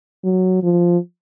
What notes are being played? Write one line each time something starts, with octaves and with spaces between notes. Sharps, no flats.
F#3
F3